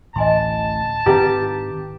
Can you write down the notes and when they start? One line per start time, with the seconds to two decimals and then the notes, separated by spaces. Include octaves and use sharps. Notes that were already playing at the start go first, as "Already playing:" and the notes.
0.16 D1 A1 E3 D#5 G#5 A5 C6
1.06 G#2 D#3 C4 E4 G4 B4 F5